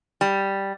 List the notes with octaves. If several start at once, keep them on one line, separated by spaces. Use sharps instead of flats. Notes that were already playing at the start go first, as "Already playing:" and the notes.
G3